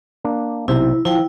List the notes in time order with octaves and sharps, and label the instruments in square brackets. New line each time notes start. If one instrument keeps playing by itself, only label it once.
[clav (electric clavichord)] A#3 D4
[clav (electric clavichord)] B1 C3 C5 [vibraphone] E4
[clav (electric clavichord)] F3 [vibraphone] E4 G5